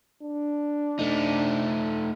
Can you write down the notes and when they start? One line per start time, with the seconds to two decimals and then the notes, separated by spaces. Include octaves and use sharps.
0.23 D4
0.99 A3 D#4